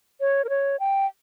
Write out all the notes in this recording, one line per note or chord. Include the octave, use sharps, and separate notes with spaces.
C#5
A#4
C#5
G5